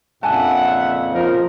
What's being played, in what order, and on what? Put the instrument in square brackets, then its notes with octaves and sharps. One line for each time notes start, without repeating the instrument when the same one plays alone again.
[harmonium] F2 A#2 C#3 [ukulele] D4 G#5 A5 [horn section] E5 F#5
[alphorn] F3 [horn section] D#4 A#4